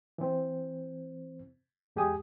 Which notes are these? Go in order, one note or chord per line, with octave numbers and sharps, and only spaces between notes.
E3 C4
E2 G#3 G4 G#4 G#5 D#6